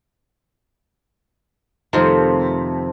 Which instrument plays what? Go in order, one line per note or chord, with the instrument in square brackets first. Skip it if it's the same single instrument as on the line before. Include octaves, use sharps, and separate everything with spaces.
[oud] F2 C3 [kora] D#3 F3 C4 [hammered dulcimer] A3 A#5